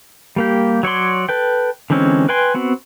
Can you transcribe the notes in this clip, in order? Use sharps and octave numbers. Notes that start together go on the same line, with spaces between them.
G3 A#3 G4
F#3 C#5 D5 C6
A4 B4 G5
D3 E3 G#3 C4 C#4
B4 G5 G#5 C6
B3 C4 F#4